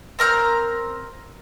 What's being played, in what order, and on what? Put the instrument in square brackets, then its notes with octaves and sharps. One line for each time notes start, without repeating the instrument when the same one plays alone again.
[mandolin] C4 A#4 F6 G6